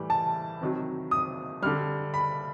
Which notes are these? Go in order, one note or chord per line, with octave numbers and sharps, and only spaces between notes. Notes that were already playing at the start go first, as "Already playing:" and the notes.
Already playing: A2 E3 G3
A5
C3 D#3 F#3
D#6
D3 G3 F6
B5